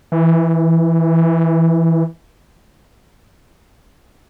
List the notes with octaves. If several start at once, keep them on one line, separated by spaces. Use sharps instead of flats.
E3